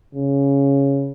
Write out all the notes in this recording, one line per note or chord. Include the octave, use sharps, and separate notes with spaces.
C#3